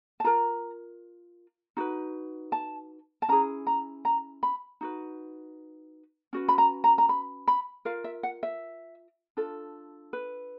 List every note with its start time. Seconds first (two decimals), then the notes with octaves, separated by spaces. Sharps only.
0.20 A5
0.24 F4 A#4 A#5
1.77 D#4 F#4 B4
2.52 A5
3.22 A5
3.28 C#4 E4 G#4 A#5
3.67 A#5
4.05 A#5
4.43 B5
4.81 D#4 F#4 B4
6.33 C#4 F#4 B4
6.48 B5
6.58 A#5
6.84 A#5
6.98 A#5
7.09 B5
7.47 B5
7.85 F4 A#4 F5
8.04 E5
8.23 F#5
8.43 E5
9.37 D4 F4 A4
10.13 B4